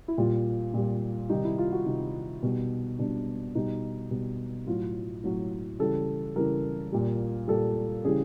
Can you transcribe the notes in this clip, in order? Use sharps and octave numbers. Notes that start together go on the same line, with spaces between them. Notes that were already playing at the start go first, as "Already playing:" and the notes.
E4
A#2 G3 F4
A#2 G3
C3 D#3 G3 D#4
E4
F4
F#4
C3 D#3 G3 D#4
B2 G3
B2 G3 D4
B2 G3 D#4
B2 G3
A2 F#3 F4
A2 F#3
C#3 E3 G3 A4
C#3 E3 G3 A#4
A#2 G3
A#2 G3 A4
C#3 E3 G3 G#4